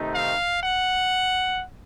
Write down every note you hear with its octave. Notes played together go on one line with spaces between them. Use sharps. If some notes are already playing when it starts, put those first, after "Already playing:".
Already playing: C3 D#3 A3 C4 D#4
F5
F#5